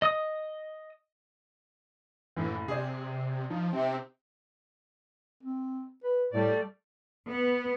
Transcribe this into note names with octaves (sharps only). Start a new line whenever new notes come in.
D#5 D#6
F#1 A2 E3 E4
C3 G#4 C5 D5
F3 D#4
C3 C4
C4
B4
A2 G3 A3 D5
B3